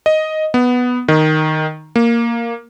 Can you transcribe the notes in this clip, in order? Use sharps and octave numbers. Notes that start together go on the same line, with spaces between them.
D#5
B3
D#3
A#3